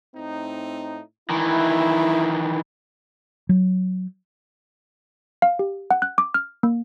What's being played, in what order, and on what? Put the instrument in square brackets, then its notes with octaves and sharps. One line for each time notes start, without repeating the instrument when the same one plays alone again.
[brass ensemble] A2 C4 D#4
[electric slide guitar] D#3 E3 [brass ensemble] E4
[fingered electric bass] F#3
[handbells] F5
G4
F#5
F#6
D6
F6
A#3